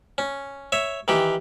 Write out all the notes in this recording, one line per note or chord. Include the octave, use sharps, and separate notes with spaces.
C#4
C#5 E5
D#3 E3 G4